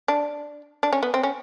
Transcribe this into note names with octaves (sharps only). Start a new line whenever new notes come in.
D4
D4
C#4
B3
C4
C#4